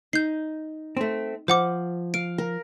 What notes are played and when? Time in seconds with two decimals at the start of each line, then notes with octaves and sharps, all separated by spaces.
0.13 D#4 G6 C7
0.97 A3 C4
1.48 F3 C5 F#5 D6
2.14 F5 D7
2.38 A#4